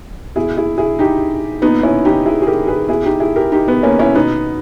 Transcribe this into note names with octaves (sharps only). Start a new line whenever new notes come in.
B2 E4 G#4
E4 G#4
E4 G#4
D#4 G4
A#2 B3 D#4
C#4 E4
D#4 G4
E4 G#4
G#4
G4 A#4
G#4 B4
B2 E4 G#4
D#4 G4
E4 G#4
G4 A#4
D#4 G4
B3
A#3 C#4
C#4 E4
B2 B3 D#4